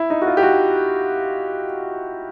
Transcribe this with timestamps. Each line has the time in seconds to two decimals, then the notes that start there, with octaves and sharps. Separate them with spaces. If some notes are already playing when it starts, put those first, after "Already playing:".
Already playing: E4
0.10 D#4
0.22 F#4
0.27 F4
0.37 G4
0.43 F#4